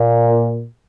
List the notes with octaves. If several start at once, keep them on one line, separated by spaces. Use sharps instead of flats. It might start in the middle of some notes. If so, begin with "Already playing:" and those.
Already playing: A#2